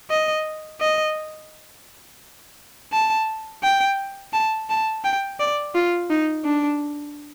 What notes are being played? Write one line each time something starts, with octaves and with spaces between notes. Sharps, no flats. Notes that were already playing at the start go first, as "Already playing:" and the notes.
D#5
D#5
A5
G5
A5
A5
G5
D5
F4
D#4
D4